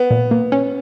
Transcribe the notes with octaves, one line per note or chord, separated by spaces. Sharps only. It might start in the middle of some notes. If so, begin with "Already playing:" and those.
Already playing: B3
A#2
A#3
C#4